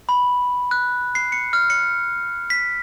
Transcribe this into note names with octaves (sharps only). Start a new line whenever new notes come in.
B5
F#6
C7
C#7
F6
C#7
B6